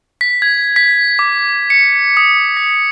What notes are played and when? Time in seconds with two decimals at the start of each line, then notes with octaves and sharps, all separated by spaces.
0.21 B6
0.42 G#6
0.76 B6
1.19 D6
1.70 C#7
2.17 D#6
2.57 B6